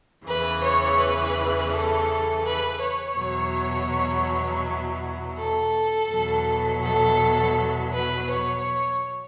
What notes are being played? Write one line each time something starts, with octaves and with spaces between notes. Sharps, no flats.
E2 C#3 E3 B4
C#5
B4
A4
B4
C#5
E2 B2 F#3
A4
E2 B2 F#3
A4
B4
C#5